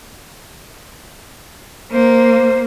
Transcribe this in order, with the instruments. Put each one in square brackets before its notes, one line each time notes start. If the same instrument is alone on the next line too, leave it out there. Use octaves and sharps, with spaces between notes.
[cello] A#3 [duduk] C5